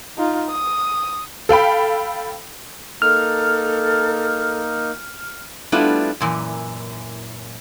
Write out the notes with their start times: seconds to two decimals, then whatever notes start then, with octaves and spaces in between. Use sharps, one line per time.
0.18 D#4 F4
0.50 D#6
1.49 A4 F5 G5 B5
3.02 A#3 D#4 A4 F6
5.72 G3 A3 B3 D4 E4 F4
6.20 F#2 A#2 E3